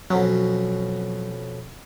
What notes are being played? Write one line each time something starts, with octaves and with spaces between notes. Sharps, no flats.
F2 B2 F#3 C#4